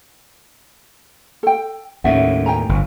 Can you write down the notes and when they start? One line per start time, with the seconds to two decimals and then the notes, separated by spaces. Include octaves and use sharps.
1.43 A4 G5
2.04 D#2 A2 C#4 E5 F#5
2.46 G5 G#5 A#5
2.69 G1